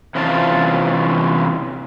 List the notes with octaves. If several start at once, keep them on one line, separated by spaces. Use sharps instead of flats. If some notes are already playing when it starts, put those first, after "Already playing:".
C3 E3 C#4 F4 C#5 A5